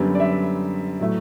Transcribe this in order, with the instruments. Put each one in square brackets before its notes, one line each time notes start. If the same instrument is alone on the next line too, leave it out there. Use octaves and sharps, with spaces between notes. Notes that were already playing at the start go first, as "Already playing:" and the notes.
Already playing: [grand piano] F#2 D3 G3 B3
D5
E5
A2 F#3 A3